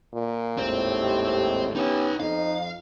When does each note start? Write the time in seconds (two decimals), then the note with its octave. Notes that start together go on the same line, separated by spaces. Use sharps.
0.13 A#2
0.57 G#1 D#2 A2 C4 C5
0.92 G4
1.76 B3 C#4 D#4 G4 E5
2.20 F2 D#4 F5